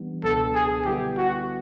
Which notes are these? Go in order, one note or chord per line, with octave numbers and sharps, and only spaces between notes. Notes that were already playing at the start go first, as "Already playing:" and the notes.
Already playing: E3 G3 B3 D4
C#2 B2 F#3 B3 D4 A4
G#4
D3 G3 B3 E4 G4 A4
F#4